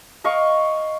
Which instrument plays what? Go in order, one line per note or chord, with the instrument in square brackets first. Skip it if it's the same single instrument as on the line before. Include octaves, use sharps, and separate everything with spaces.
[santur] A#4 D#5 F5 C#6